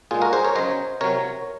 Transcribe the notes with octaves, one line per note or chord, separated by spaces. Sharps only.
A#2 G#3 F4 G#4
F#4 A#4
G#4 C5
A#4 C#5
C#3 F#3 C5 D#5
C3 F#3 A#4 C#5